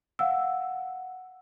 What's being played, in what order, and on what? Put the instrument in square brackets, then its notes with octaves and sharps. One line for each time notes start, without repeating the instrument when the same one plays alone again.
[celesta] F5 F#5 E6